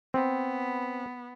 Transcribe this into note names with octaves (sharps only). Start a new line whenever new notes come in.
B3 C4